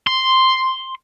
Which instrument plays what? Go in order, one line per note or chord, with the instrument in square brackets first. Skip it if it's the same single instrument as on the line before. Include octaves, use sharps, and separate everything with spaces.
[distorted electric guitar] C6